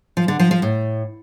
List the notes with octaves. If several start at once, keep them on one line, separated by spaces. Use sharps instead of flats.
F3
D3
F3
F3
A2